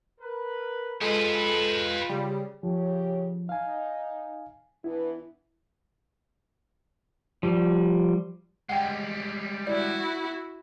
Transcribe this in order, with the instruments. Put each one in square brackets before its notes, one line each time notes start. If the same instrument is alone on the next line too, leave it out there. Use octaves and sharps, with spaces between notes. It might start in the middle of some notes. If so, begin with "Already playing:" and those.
[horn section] A#4 B4
[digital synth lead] G#3 [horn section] F4 B5 [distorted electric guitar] G4 B4 [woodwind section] A4
[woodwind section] C#3 [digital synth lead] G3
[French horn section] C#3 G4 C#5 [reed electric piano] F3
[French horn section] D#4 [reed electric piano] F5 G#5
[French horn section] E3 B3 D4 [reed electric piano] E4
[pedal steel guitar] F3 G3
[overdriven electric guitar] G3 G#3 [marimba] F#5 G5
[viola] E4 F#4 [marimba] D5